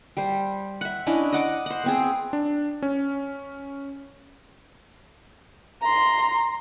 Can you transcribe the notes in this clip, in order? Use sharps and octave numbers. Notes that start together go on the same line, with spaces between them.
G3 C5
E5 F#5
C#4 D4 E4 D#5
D#5 F#5 D6
C5 F#5
B3 C4 G#4
D4
C#4
A#5 C6